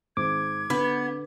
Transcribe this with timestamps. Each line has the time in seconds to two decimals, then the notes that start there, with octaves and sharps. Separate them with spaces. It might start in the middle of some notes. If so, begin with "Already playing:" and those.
0.17 G#1 G#2 D6 G#6
0.70 D3 B3 B4